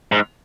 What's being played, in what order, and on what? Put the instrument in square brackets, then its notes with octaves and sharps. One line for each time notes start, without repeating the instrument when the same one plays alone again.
[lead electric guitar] G#2